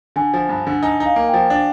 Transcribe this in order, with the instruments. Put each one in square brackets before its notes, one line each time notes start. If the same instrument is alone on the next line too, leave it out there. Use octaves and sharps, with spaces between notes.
[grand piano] D3 [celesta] G#5
[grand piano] F3
G2
D3
[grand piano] D#4 [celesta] G#5
[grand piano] D#4
[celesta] F5
[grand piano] A#3
[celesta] G5
[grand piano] F3
D4